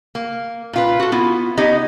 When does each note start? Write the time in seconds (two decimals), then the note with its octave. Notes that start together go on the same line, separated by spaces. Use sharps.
0.15 A#3
0.73 A#2 F4 B4
1.00 F#4 A4
1.12 B3 E4 F4
1.57 B3 D#4 G4 C#5 D#5